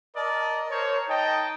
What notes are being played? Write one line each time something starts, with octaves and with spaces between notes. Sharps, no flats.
A#4 D5 D#5 A5
A#4 C5 C#5
D#4 D#5 G5 A5